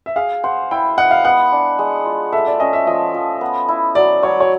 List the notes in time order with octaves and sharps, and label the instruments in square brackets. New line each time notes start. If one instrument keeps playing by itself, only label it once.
[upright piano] E5
[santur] G#4 [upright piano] F5
[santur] C5 [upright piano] F#5
[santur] E4 [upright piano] G5
[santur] D#5 [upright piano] F#5
[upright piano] F5
[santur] B3 [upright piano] F#5
[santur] D4
G#3
F4
[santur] A3 [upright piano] E5
[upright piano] D5
[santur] C#4 [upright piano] D#5
[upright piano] E5
[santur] F3 [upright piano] D#5
[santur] F3
B3
E4
[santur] F#3 [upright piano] D5
[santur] F#3 [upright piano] C#5
[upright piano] C#5